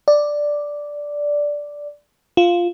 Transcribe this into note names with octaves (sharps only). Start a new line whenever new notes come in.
D5
F4